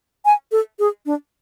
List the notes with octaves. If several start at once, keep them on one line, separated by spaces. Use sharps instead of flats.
G#5
A4
G#4
D4